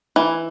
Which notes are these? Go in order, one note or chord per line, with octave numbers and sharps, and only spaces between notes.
E3